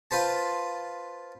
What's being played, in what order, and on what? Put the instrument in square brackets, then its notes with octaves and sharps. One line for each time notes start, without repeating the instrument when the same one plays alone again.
[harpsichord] F4 B4 C5 A5